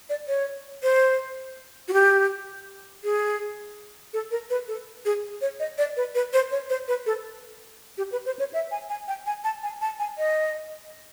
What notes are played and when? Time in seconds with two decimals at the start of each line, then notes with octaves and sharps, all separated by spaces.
0.09 D5
0.28 C#5
0.83 C5
1.88 F#4
1.93 G4
3.04 G#4
4.13 A4
4.31 A#4
4.50 B4
4.68 A4
5.05 G#4
5.41 C#5
5.60 D#5
5.78 D5
5.97 B4
6.15 B4
6.33 C5
6.51 C#5
6.70 C5
6.88 B4
7.06 A4
7.98 G4
8.12 B4
8.26 C5
8.39 C#5
8.53 E5
8.71 G#5
8.89 G#5
9.08 G5
9.26 G#5
9.44 A5
9.63 G#5
9.81 A5
9.99 G#5
10.18 D#5